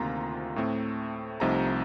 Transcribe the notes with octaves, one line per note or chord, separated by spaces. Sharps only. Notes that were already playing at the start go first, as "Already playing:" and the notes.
Already playing: D2 C3 D#3 A#3 F4 A#5
A2 A3 C4
C2 C3 F3 A3 D#4 A#5